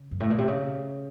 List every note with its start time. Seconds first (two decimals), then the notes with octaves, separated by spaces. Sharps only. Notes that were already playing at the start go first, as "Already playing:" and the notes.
Already playing: C#3
0.11 F#2
0.20 A2
0.30 A#2
0.38 C3
0.48 C#3